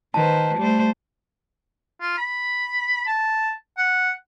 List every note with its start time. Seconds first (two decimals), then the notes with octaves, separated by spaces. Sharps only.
0.14 D#3 B4 C5 A5
0.58 G3 A3 C5
2.01 F4
2.18 B5
3.07 A5
3.78 F#5